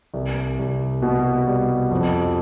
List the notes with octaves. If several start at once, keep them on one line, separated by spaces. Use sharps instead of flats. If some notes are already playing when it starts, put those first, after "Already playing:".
C2
C2
B2
G3
F2